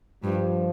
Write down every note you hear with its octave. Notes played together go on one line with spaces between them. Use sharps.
G2 F3